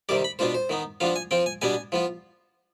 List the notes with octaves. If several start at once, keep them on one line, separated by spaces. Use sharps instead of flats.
C3 D#3 G3 D5
B5
B2 B3 D4 F4 C5
C5
D#3 B3 D#4
F3 B3 D4 F4 F5
G#5
F3 C4 F4 G5
G#5
B2 G3 B3 D4 G#5
F3 B3 F4